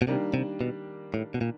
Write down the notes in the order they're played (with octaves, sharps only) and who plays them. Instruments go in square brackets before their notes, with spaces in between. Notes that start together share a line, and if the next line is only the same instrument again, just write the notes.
[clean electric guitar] B2
[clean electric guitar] C3 [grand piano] D#3 G3 A#3 D4
[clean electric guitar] C3
B2
A2
B2
A#2